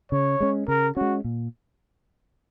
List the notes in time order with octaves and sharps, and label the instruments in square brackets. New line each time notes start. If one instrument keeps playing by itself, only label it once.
[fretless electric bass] C#3 [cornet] C#5
[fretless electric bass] G#3 C#4
[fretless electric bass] C#3 [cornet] A#4
[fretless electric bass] G#3 C#4 [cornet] F#4
[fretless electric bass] A#2